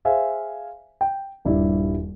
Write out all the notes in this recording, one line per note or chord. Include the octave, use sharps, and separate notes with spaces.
G#4 C5 E5 F5 G#5
G5
D#1 G2 G3 E4 D5